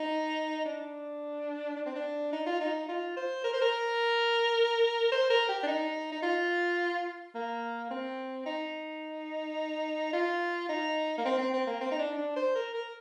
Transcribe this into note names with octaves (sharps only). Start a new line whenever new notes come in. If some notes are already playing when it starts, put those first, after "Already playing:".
Already playing: D#4
D4
D4
C4
D4
D#4
F4
D#4
F4
C5
A#4
C5
A#4
C5
A#4
G4
D4
D#4
D#4
F4
A#3
C4
D#4
F4
D#4
A#3
C4
C4
C4
A#3
C4
D#4
D4
D4
C5
A#4
A#4